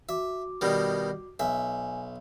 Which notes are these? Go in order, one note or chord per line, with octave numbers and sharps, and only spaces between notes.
F#4 E5 D6
B2 D#3 G3
B1 E5 G#5